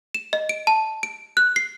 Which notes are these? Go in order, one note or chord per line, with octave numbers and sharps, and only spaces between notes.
E7
D#5
D7
A5
D7
F#6
C7